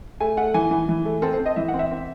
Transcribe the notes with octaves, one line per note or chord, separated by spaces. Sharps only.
A3 G#5
A3 F#5
E3 G#5
E3
E3
A3
C4 A4
C5
C4
D#5
E3 E5
F#5
C4
E5
C4